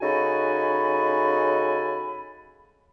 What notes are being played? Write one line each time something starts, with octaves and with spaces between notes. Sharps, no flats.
C#3 D#4 F#4 A4 G#5 B5